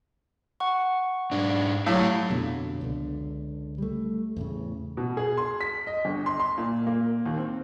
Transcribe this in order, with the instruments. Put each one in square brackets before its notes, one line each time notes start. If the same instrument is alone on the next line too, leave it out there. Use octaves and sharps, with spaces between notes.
[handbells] F#5 C#6
[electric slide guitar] G#2 D4
[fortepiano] A2 [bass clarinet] F#3 [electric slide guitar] G4 F5
[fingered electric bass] F2 B2 D3
C#2 D3
G3 A3
E2 A2 C#3
[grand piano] B2
G#4
C6
B6
D#5
G1
C6
C6
A#2
A#3
D#2
C4